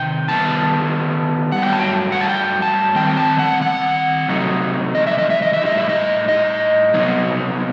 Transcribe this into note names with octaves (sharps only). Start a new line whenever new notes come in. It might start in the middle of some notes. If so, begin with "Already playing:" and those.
Already playing: C3 D#3 G5
D#3 G3 B3 A5
F#5
G2 F#3 A3 G5
A5
G5
F#5
A5
G5
A5
D#3 G3 C4 G5
A5
F#5
F#5
C3 F#3 A3 D#4
D#5
E5
D#5
E5
D#5
E5
A2 G3 D#4 D#5
E5
D#5
D#5
C3 F#3 B3 D#4